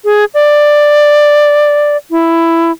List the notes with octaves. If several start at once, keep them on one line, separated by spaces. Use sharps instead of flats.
G#4
D5
E4